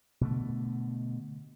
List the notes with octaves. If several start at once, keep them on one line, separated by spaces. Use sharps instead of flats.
B2 D3 A3